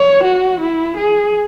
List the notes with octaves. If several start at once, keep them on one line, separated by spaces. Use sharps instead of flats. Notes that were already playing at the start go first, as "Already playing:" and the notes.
Already playing: C#5
F#4
E4
G#4